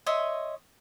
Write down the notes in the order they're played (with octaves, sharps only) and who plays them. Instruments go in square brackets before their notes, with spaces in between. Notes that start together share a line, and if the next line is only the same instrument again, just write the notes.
[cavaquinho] C#5 D#5 E5 C6